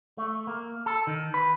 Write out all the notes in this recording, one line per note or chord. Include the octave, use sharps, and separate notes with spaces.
A3
A#3
A4
D#3
B4